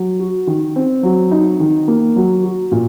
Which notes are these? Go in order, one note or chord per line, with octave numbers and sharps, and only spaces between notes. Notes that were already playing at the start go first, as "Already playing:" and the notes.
Already playing: F#3
F#4
D#3
C4
F#3
D#4
D#3
A#3
F#3
F#4
A#2